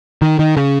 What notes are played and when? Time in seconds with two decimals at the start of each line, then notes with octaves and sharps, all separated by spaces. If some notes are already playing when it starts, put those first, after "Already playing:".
0.22 D#3
0.39 D#3
0.57 C#3